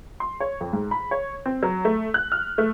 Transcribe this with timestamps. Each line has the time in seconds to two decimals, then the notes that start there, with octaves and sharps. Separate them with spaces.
0.20 C6
0.40 C#5
0.61 F2
0.73 G#2
0.91 B5
1.11 C#5
1.46 C4
1.63 F#3
1.85 A3
2.14 F#6
2.32 F6
2.58 A3